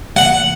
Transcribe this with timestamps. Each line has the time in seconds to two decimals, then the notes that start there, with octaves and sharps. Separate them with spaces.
0.17 F#5